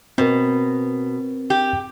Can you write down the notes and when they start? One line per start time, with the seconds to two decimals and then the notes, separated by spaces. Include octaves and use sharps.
0.18 B2 C4 A#4
1.50 G4